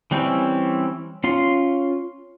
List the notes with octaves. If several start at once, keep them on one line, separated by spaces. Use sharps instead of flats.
E3 G3 C4 C#4 E4
C#4 F4 C6